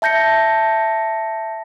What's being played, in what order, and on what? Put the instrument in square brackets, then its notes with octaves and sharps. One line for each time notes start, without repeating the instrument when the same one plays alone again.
[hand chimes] E5 A5 G6 A#6 C#7